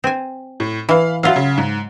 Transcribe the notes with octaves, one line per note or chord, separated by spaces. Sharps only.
C4 G#5
A2
E3 F5 B5
F#3 F4 F#4 E5 F5
C#3
G#2